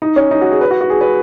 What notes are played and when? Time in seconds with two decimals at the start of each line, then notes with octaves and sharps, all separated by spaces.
0.02 D#4
0.16 C#4
0.31 D#4
0.41 F#4
0.51 G#4
0.61 B4
0.71 F#4
0.81 F#4
0.90 G#4
1.01 B4